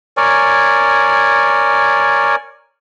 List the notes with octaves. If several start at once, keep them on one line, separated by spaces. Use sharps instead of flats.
A#4 C#5 D5 G#5